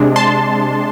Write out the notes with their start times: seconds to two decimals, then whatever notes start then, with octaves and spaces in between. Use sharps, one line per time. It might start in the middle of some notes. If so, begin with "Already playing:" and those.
Already playing: C3 G#3 D4
0.16 A5 C6